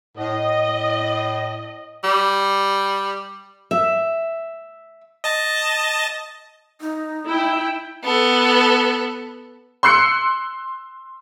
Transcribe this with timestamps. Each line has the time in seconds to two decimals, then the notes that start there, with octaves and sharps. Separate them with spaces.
0.17 A2 D#5
2.04 G3
3.71 E5
5.24 D#5 A5
6.81 D#4
7.26 E4 G5
8.04 B3 A4
9.83 C6 E6 F#6 C7 C#7